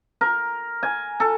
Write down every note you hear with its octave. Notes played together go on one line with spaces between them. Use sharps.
A#4
G#5
A4